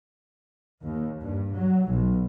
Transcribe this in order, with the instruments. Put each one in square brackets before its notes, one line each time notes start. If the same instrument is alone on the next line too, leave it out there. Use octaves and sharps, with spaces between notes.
[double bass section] D#2
G2
F#3
B1